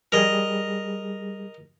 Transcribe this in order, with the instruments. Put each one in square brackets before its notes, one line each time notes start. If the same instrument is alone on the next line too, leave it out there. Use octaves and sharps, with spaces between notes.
[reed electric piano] G3 G#4 [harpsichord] A#4 D#5